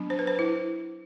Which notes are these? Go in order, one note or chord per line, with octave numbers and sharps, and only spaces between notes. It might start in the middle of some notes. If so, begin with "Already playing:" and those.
Already playing: F#3 B3 D4
C5
B4
C5
E4